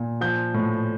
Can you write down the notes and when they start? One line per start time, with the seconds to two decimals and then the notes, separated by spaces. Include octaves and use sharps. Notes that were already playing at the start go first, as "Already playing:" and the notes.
Already playing: A#2
0.21 F3 G6
0.54 A2